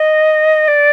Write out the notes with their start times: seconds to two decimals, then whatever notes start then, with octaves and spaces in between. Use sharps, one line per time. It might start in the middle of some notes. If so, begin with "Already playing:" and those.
Already playing: D#5
0.67 D5